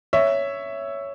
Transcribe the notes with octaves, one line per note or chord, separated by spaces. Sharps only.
C#5 E5